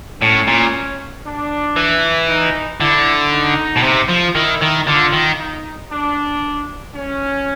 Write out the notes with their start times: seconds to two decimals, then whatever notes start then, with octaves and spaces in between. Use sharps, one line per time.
0.22 A2 C#4
0.47 A#2
1.25 D4
1.76 E3
2.28 D#4
2.80 D3 E4
3.32 D#4
3.77 B2
3.83 C3
4.09 F3
4.35 D#3 E4
4.61 D#3
4.87 D3 F4
5.12 D#3
5.38 D#4
5.91 D4
6.95 C#4